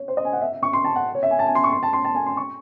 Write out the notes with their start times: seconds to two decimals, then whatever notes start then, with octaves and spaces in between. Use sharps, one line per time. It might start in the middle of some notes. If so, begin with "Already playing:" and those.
Already playing: C#5
0.08 C5
0.17 D#5
0.25 G#5
0.33 F#5
0.41 E5
0.52 E5
0.63 C#6
0.73 C6
0.84 A5
0.96 F#5
1.15 C#5
1.23 E5
1.31 G#5
1.39 A5
1.47 G#5
1.55 C6
1.64 C#6
1.72 C6
1.83 A5
1.93 C6
2.05 A5
2.15 G#5
2.26 C6
2.37 C#6